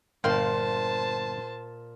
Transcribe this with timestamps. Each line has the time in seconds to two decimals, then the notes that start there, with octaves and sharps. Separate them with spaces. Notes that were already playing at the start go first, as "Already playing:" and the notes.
0.24 G1 A#2 C5 F5 G5 A5 C6